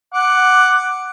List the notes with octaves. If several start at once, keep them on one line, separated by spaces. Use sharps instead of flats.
F#5 D6